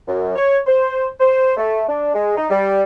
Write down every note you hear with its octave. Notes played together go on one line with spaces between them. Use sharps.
F#2
C#5
C5
C5
A3
D4
G#3
D#4
G3